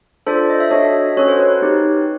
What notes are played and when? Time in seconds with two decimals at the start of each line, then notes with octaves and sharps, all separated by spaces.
0.27 D4 F4 A4 C5 D5
0.50 D#5
0.60 E5
0.70 D4 F#4 A4 C#5 D#5
1.17 C#4 F#4 A4 C#5
1.28 C5
1.39 B4 C#5
1.62 C4 D#4 G4